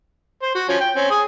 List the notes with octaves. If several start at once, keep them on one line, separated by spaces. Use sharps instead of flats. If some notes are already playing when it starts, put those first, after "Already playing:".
C5
F#4
F3 C#4
G5
C4 C#4
G#4